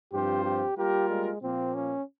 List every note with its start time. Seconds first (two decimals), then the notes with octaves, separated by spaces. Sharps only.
0.12 G2 F3 C4 F4 G4 C5
0.44 G4
0.77 G3 A#3 F4 G4 A#4
1.10 G#3
1.42 A#2 F3 A#3 C4
1.74 C#4